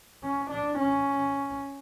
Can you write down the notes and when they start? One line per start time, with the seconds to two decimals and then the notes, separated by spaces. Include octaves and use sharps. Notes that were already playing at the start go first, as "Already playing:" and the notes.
0.23 C#4
0.51 D4
0.79 C#4